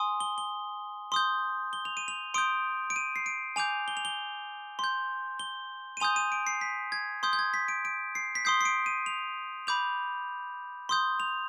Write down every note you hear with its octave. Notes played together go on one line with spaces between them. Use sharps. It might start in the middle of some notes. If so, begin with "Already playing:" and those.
Already playing: G#5 C6 D#6
G7
G7
C6 D#6 G6
G7
F7
D#7
F7
C6 D#6 G6 D7
D7
D#7
C7
D7
G#5 D6 G6 F7
G7
F7
G7
C6 G6
G7
D#7
G#5 C6 D#6 G6 F7
D#7
D7
C7
B6
G#6
C6 D#6 G6
G6
G#6
B6
D7
D7
C7
B6
C6 D#6 G6 C7
C7
D7
D#7
F7
B5 D6 G6 F7
C6 D#6 G6
F7